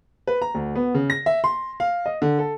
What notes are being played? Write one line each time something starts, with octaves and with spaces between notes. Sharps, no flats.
B4
A#5
D2
B3
C#3
A#6
E5
C6
F5
D#5
D3
A4